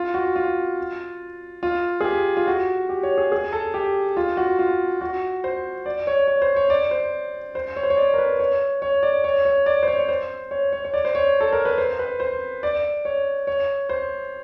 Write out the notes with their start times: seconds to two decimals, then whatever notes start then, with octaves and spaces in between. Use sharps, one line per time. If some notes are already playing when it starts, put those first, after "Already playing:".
Already playing: F4
0.14 F#4
0.36 F4
1.63 F4
2.01 G#4
2.05 G4
2.37 F4
2.47 F#4
2.89 G4
3.03 C#5
3.18 G#4
3.32 G#4
3.53 A4
3.74 G4
4.17 F4
4.37 F#4
4.59 F4
5.01 F#4
5.44 C5
5.86 D5
6.07 C#5
6.27 C#5
6.42 C5
6.56 C#5
6.70 D5
6.91 C5
7.55 C5
7.76 C#5
7.83 C5
7.90 C#5
7.97 D5
8.14 A#4
8.18 B4
8.39 C#5
8.82 C#5
9.03 D5
9.24 C#5
9.45 C#5
9.66 D5
9.83 C5
9.88 C#5
10.00 C#5
10.09 C5
10.51 C#5
10.73 C#5
10.85 C#5
10.94 D5
11.05 C5
11.15 C#5
11.41 A4
11.53 A#4
11.65 B4
11.78 C5
11.99 B4
12.20 C5
12.63 D5
13.05 C#5
13.47 C#5
13.89 C5